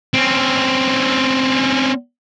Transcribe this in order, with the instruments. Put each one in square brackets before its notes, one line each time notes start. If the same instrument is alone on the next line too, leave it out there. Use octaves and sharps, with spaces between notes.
[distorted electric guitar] C4 C#4